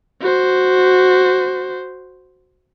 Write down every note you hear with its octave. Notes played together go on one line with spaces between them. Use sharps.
F#4 C5